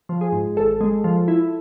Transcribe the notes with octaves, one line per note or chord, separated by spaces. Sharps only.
F3
G#4
G#2
G#1 A4
G#3
F3
E4